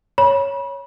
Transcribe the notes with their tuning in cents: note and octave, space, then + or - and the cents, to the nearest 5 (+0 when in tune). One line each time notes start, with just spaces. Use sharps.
C#5 +0 B5 -35